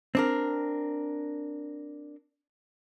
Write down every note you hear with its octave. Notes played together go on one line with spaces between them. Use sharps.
C4 D4 A#4